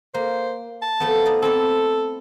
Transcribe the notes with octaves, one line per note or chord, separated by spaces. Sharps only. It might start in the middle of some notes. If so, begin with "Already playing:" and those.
A#3 C5
A5
F3 A3 B3
D#4 D5
C4 E4 A4 D5